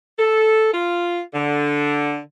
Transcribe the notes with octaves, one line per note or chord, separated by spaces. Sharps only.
A4
F4
D3